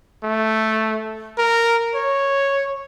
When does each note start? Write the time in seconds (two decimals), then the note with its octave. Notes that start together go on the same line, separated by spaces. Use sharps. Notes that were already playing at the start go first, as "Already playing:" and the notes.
0.23 A3
1.38 A#4
1.95 C#5